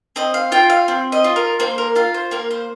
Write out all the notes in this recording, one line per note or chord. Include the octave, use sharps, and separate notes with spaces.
C4 D#5
F5
F4 G5
F5
C4
D#5
F4
A#4
A#3 C5
A#4
F4 F5
C5
A#3 A#4
C5